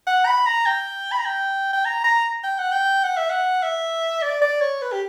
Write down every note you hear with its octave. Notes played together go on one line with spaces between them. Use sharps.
F#5
B5
A#5
G5
B5
A#5
G5
G5
A#5
A#5
G5
F#5
G5
F#5
E5
F#5
E5
D5
D5
C#5
B4
G4